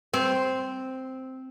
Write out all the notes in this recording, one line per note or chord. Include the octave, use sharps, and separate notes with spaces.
C4